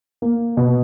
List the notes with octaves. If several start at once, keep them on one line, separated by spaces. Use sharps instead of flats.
A#3
B2